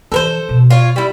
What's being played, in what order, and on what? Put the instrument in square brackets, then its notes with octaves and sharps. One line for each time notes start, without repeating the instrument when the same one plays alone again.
[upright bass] E3 F3 [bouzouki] A4 A#4 C5
[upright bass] B2
[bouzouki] F4 C#5
G3 E4